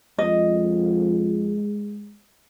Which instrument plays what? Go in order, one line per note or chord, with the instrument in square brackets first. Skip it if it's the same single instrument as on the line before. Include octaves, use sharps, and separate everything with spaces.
[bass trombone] F2 [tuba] G#3 [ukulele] D#5